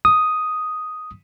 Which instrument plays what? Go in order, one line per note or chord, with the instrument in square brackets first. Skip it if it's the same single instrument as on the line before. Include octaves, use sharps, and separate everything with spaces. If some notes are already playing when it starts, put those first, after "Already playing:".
[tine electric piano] D#6